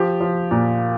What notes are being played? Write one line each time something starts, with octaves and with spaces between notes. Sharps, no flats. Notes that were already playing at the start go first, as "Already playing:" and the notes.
Already playing: F3 G4
F3
A#2